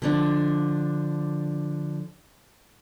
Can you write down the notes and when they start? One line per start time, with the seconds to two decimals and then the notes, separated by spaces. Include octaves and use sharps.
0.02 D3 F3 D4